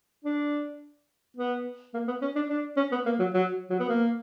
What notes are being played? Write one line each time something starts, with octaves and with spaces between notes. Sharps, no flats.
D4
B3
A#3
B3
C#4
D4
D4
C#4
B3
A#3
F#3
F#3
F#3
B3
A#3